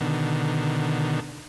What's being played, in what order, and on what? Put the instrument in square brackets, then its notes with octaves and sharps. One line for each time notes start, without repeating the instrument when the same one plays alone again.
[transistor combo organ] B2 D3 D#3